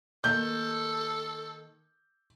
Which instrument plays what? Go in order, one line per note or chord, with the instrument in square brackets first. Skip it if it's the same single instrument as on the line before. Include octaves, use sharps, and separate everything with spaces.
[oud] D#3 A#3 [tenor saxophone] A4 [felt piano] G6